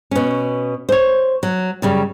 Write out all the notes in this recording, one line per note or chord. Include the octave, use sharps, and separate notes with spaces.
B2 C#4
C5 C#5
F#3
F#2 C#3 G3